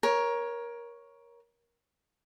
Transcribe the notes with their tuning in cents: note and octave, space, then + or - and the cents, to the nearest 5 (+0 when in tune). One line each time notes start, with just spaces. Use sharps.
A#4 +20 C#5 +0